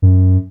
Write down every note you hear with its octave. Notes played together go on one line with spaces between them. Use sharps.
F#2